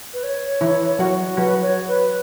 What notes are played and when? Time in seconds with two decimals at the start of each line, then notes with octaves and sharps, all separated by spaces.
0.14 B4
0.23 C#5
0.61 E3 E4
0.99 F#3 F#4
1.37 F#3 F#4 B4
1.63 C#5
1.88 B4